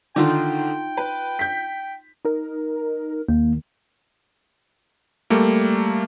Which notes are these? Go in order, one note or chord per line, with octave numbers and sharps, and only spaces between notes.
D3 D#3 D#4 F4 G5
B4
G6 B6
D#4 A#4
D#2 A#3
G3 A3 A#3